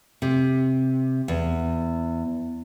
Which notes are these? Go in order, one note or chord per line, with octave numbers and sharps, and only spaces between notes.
C3
E2